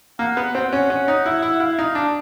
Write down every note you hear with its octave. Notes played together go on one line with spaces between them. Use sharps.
A#3 F#5
B3
C4 F#5
C#4
C#4
D#4
E4
E4
E4 F5
D#4
D4